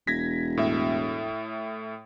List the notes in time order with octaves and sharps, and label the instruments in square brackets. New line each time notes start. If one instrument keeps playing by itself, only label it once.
[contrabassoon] E1 [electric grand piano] G#6 A#6 B6
[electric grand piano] A2 E5